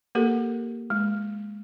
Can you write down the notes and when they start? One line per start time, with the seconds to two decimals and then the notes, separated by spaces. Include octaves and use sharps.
0.15 A#3 G4 A4 A#4
0.90 G#3